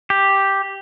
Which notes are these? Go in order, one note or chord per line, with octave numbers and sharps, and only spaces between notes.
G4